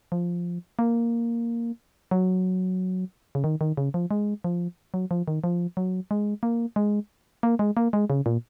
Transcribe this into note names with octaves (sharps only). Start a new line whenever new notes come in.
F3
A#3
F#3
C#3
D#3
D#3
C#3
F3
G#3
F3
F#3
F3
D#3
F3
F#3
G#3
A#3
G#3
A#3
G#3
A#3
G#3
C#3
A#2